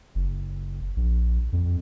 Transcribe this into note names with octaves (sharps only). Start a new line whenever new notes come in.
F#1
A#1
F2